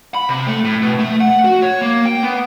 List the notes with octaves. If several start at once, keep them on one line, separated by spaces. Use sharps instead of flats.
B5
C3
A3
A2
B2
A3
F#5
F#4
C#5
A#3
G5
B3